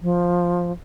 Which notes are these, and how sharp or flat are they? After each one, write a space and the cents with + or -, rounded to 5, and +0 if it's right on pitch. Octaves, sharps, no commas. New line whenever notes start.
F3 +10